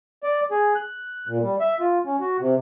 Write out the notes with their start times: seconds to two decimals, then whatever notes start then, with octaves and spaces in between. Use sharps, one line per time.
0.23 D5
0.51 G#4
0.75 F#6
1.28 A#2
1.42 G3
1.60 E5
1.80 F4
2.06 C#4
2.20 F#4
2.40 C3